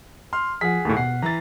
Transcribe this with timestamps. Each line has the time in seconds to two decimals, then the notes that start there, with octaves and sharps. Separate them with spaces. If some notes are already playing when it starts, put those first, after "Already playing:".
0.33 C6 F6
0.61 F3 G#4 F#5 B6
0.85 D#2 A2 A3
0.97 B2 F#5 C7
1.22 E3 A#5 A6